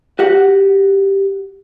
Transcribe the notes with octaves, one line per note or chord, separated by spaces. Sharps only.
F#4 G4 F#5